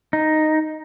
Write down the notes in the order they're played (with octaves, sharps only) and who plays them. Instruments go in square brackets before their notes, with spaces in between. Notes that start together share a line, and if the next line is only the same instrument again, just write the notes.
[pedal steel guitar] D#4